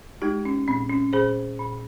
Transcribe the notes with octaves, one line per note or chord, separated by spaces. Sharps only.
G#3 D#4 G4
C#4
A#2 C4
C#4
A#2 G#4 C5
A#2